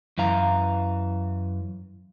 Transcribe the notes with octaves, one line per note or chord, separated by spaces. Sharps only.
F#2 E3 F5 A#5